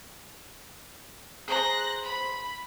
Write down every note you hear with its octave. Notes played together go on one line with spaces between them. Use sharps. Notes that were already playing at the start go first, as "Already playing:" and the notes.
G#4 C5 A#5 F#6 A#6
B5